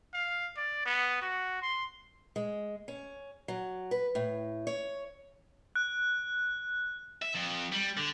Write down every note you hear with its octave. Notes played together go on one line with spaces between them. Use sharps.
F5
D5
B3
F#4
C6
G#3
C#4
F#3
B4
A2
C#5
F#6
E5
F2
G3
D3